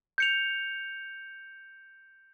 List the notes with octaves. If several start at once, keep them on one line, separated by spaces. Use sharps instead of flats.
G6 C#7 F7